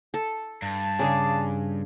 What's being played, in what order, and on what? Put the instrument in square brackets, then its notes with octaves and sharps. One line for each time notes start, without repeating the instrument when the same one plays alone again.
[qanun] A4
[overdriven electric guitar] G2 [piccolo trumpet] A5
[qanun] C#3 D4 G#4